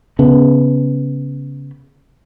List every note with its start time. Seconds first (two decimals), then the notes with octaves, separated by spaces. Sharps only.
0.19 C#3 B3